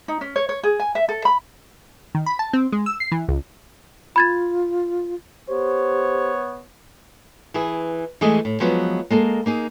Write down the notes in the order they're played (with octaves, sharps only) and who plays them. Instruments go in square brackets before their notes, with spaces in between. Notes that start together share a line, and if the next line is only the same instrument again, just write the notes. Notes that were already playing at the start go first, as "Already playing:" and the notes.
[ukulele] D#4
C#4
C#5
C#5
G#4
G#5
E5
A4
B5
[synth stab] D#3
B5
A5
C4
G#3
E6
C7
E3
C#2
[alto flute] F4 [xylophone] B5 G#6 A6
[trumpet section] B3 C#5 [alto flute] G4 [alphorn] C5
[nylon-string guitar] E3 E4 G#4
E3 G#3 A3 G#4 D#5
A2
F3 F#3 G#3 B3
G#3 A#3 A4 A#4
A#3 D#4 G#4